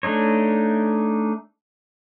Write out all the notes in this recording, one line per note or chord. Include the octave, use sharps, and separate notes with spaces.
A3 D4 D#4 C#5